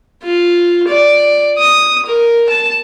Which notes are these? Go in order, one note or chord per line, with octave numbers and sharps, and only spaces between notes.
F4
D5
D#6
A#4
A5